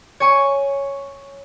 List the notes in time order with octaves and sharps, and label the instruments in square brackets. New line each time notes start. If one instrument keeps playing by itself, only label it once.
[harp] C#5 G#5 C#6